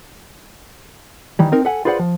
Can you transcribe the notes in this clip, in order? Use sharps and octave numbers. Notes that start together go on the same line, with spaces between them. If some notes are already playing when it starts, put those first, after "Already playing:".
D#3 E3 G3
C4 D#4 A#4
A4 E5 F#5 G#5
F4 G#4 B4 C5 D5 F#5
F3